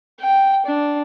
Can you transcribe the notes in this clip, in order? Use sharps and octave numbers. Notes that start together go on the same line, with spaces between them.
G5
D4